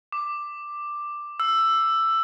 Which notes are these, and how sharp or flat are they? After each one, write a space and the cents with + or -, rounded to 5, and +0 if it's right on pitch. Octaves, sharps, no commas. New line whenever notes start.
D6 +10
E6 +10